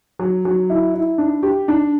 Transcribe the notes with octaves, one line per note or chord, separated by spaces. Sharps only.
F#3
F#3
E4
E4
D4
G4
D4